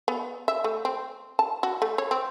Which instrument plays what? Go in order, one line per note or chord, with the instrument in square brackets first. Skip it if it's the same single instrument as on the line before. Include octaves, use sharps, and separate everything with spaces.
[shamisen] B3
E5
A3
C4
A5
F#4
A3
C#5
C4